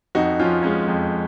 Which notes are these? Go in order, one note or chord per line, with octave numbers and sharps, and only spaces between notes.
F2 D#4 F#4
F3 C#4 F4
G#3 C#4
F2